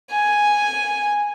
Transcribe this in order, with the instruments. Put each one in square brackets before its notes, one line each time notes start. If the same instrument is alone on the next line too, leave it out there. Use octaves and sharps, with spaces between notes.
[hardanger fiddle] G#5